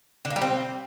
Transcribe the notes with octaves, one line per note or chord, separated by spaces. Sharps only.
D3
A#3
G3
C4